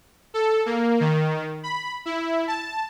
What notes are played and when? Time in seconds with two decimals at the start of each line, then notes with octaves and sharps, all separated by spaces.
0.34 A4
0.66 A#3
1.00 D#3
1.63 B5
2.06 E4
2.48 A5